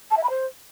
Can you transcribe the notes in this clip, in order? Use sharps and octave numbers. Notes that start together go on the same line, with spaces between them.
A5
E5
B5
C5